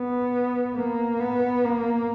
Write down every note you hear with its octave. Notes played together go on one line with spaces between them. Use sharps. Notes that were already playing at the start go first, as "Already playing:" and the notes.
Already playing: B3
A#3
B3
A#3